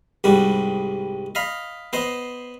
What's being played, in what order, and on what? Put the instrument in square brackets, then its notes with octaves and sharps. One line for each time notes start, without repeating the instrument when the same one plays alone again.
[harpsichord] C2 G#2 G3 F#4
D#5 F5 B5
B3 C5 D#5